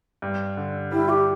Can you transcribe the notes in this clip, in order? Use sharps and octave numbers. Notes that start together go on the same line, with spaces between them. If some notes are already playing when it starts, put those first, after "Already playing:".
G2
D3
G3 E4
G4